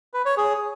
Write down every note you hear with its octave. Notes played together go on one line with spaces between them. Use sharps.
B4
C#5
G#4